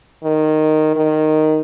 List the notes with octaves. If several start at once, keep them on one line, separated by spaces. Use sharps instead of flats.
D#3
D#3